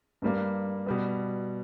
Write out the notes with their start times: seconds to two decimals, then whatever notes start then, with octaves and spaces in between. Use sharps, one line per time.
0.22 G2 G3 A#3
0.86 B2 G3 B3